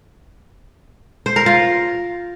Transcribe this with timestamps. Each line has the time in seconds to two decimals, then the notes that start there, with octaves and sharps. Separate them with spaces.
1.26 C5
1.36 A#4
1.46 F4